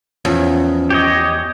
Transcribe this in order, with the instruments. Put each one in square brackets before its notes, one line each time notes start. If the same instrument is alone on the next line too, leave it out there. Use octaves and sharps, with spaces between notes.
[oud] E2 [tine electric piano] F3 C#4
[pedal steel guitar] G4 C#5 D#5